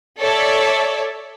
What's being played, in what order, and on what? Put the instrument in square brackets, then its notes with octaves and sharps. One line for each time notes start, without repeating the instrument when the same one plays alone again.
[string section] A4 C#5 D5 E5